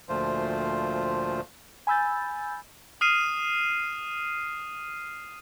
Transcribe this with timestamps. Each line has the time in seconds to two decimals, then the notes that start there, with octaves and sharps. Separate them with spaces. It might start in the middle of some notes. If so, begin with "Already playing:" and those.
0.09 D2 A#2 F3 A3 F4 C5
1.87 G#5 B5 E6 G6 A6
3.01 D#6 F6 C7 D#7 E7